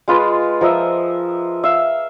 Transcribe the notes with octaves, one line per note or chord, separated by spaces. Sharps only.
G#3 F4 B4
F3 A#4 D#5 E5
E5 F5